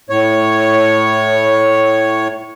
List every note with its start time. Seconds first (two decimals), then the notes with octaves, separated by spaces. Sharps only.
0.10 A2 C#5